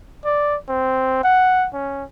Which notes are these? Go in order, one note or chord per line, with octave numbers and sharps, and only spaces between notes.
D5
C4
F#5
C#4